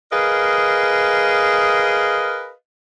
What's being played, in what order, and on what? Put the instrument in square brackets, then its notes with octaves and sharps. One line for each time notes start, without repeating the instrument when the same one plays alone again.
[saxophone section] G#4 A#4 B4 D#5 F5